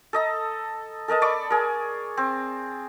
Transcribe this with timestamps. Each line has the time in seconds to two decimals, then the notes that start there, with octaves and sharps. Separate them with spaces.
0.13 A4 D#5 A#5
1.08 A4 A#4 D#5 A5
1.22 D5 B5 C#6 D6
1.50 G#4 A#4
2.17 C4